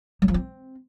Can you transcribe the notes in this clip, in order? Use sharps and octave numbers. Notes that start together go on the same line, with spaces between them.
F#3
F3
C4